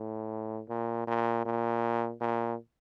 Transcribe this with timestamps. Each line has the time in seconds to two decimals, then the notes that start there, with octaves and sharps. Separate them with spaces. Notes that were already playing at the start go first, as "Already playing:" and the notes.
Already playing: A2
0.69 A#2
1.07 A#2
1.45 A#2
2.21 A#2